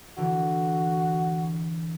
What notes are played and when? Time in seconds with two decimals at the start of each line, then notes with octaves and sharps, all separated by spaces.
0.17 D3 E3 F#4